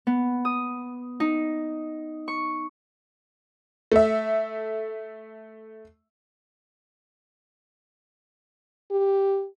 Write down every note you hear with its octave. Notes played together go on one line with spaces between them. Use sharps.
B3
D#6
D#4
C#6
A3 E5
G4